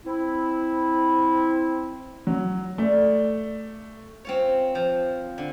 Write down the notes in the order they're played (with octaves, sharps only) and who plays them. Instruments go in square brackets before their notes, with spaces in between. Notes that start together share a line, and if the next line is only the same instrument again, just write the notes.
[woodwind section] C4 E4
[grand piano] F#3
[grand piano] A3 [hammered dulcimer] D5
[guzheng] C4 F4 C#5
F3
D3